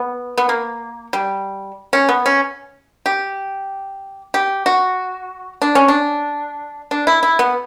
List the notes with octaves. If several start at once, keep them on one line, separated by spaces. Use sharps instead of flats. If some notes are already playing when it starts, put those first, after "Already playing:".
Already playing: B3
B3
A#3
G3
C#4
B3
C#4
G4
G4
F#4
D4
C#4
D4
D4
E4
E4
B3